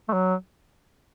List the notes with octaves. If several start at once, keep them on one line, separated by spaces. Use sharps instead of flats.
A3
F#3